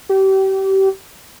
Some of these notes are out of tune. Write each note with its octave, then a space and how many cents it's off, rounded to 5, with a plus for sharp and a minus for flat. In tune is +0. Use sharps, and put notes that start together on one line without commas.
G4 -30